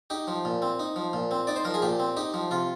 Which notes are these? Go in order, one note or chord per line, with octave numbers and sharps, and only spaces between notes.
D#4 G4
F3
A#2
C4
D#4
F3
A#2
C4
D#4 D5
C5
F3 A#4
G#4
A#2 G4
C4
D#4 G4
F3
C3 F4